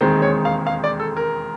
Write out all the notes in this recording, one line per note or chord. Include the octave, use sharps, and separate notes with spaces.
E1 D#2 D#3 G#3 C4 C5
C#5
F5
F5
D5
A4
A#4